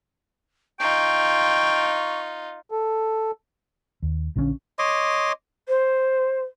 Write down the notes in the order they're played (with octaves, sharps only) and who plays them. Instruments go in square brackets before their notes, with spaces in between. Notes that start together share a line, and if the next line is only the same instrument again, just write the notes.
[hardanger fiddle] D#4 F4 [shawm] G5 [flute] C#6
[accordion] A4
[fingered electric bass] D#2
A#1 D3 F3 C#4
[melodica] C#5 D#5 C6 D6
[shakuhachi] C5